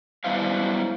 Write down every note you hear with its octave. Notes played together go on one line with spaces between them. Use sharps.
F#3 G3 B3 E4 C5 F5